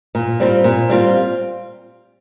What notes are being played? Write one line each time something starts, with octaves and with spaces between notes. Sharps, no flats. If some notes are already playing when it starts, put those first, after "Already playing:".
A#2
G3 C4 F4
A#2
G3 C4 F4